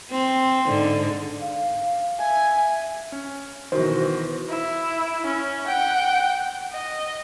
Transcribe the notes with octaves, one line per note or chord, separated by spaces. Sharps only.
C4
G#2 D3
F5
E5 G#5
C#4
B2 D#3 E3 B3 F#4 C5
E4
C#4
F#5 G5
D#5